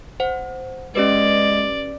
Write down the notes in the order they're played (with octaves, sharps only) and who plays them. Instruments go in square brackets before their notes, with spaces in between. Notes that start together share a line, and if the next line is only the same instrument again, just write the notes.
[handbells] C5 F#5
[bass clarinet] G#3 [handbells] C#4 G4 B4 [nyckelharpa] D5